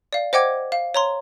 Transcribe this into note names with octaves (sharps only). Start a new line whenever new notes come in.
D5 F5
C5 D#5 F#5 G5 D6 G#6
F5
C#5 A#5 C6